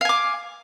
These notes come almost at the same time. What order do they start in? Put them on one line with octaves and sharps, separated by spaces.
F5 G#5 D6